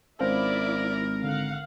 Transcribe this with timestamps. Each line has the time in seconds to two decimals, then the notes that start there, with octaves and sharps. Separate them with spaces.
0.20 G#1 C#4 E4 A#4 C5 D5 F5
1.24 D3 F5 F#5